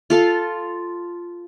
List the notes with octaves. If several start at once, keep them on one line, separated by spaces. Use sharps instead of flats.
F4 A4 F5 C6